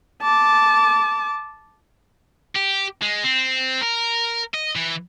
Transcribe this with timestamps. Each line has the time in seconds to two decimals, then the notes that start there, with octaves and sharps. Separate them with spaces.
0.22 A5 D6
2.55 G4
3.02 G#3
3.24 C4
3.82 A#4
4.54 D#5
4.75 E3